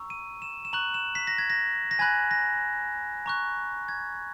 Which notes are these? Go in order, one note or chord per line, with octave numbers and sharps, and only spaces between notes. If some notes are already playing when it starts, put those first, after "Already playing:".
Already playing: A#5 C#6 E6
D#7
E7
E7
A#5 C#6 F#6 F#7
E7
B6
A#6
G#6
A#6
A#6
G#5 B5 F#6 G#6
A#6
A#5 C#6 F#6
G#6